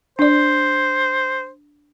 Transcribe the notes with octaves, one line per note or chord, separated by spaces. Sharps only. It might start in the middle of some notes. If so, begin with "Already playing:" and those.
D4 C5 D5